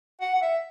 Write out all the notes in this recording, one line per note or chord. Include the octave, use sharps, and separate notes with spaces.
F#5
F#5
E5